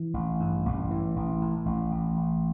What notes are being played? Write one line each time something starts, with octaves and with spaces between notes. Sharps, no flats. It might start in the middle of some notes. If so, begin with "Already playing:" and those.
Already playing: E3
A1
G2
A1
E3
A1
A2
A1
A1
A1